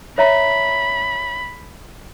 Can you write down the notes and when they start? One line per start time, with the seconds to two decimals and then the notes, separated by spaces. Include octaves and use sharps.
0.18 C#5 E5 A#5 B5